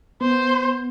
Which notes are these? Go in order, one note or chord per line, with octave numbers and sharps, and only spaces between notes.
B3 C5